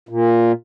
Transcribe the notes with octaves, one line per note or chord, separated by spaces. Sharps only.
A#2